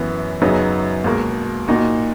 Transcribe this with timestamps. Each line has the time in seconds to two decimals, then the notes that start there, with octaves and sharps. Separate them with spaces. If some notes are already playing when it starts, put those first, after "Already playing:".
Already playing: F#2 E3 B3
0.42 F#2 C#3 F#3 B3 D#4
1.04 C#2 B2 A#3
1.68 A#2 A#3 D#4 F#4